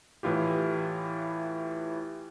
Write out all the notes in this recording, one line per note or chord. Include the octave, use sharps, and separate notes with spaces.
A2 E3 E4 F4 G4